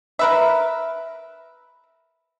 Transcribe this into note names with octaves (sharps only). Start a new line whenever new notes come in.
A#4 B4 E5